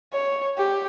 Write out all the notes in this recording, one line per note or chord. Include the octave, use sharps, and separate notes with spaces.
C#5
G4